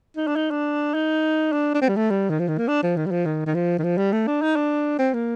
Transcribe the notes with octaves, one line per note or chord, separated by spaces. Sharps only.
D#4
D4
D#4
D4
D#4
D4
D4
C4
G3
A3
G3
D#3
F3
D#3
A#3
D4
F3
D#3
G3
F3
D#3
D#3
F3
D#3
F3
G3
A3
D4
D#4
D4
C4
A#3